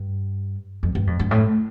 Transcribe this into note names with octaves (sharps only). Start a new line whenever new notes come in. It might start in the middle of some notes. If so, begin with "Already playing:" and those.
Already playing: G2
F2
G2
F2
G2
A2